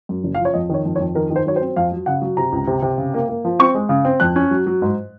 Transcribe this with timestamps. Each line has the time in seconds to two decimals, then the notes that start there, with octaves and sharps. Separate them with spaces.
0.09 F#2
0.24 F#1
0.35 F5
0.39 F3
0.45 C#5
0.54 F2 D#5
0.70 D#3 C#5
0.85 F2
0.96 C#5
1.00 F2
1.15 D#3 A#4
1.30 D#3
1.36 C5
1.46 F#3 C#5
1.56 C5
1.61 C4
1.76 F2 F5
1.92 F#3
2.06 C#3 F#5
2.22 F#3
2.37 C3 A#5
2.52 C#2
2.67 C3
2.82 C3
2.98 C#3
3.14 A#3
3.28 A#3
3.45 F3
3.59 C4 C#6
3.75 G#3
3.89 C#3
4.05 C4
4.20 F2 F#6
4.36 C#4
4.51 F#3
4.67 F#3
4.82 G#2